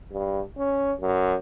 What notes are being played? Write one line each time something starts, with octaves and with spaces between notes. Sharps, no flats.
G2
C#4
F#2